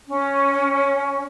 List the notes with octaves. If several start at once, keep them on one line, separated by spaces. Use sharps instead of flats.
C#4